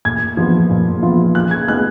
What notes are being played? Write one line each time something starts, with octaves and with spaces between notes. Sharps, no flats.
A#2 G#6
F3 B3 F4
A#2
F3 B3 F4
C#3 F#6
G#6
G#3 B3 D#4 F#6